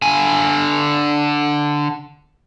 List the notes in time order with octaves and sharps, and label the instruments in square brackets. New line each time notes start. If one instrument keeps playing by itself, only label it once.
[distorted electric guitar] D3 G#5